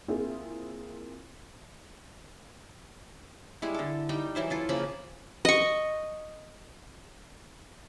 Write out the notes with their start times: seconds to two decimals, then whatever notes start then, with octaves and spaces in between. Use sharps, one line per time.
0.08 A#3 C4 E4 F4 G#4
3.62 G3 G#3 E4
3.74 D3 A4
4.09 G3 D#4 G5
4.35 E3 F#3 E4 C5
4.50 E4 F4 A4
4.69 C#3 F3 A#3 B5
5.45 D#5 C#6